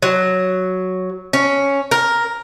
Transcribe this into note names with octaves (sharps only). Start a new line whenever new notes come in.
F#3
C#4
A#4